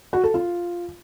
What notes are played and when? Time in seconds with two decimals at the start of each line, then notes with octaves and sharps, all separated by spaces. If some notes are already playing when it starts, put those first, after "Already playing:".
0.13 F#4
0.24 A4
0.34 F4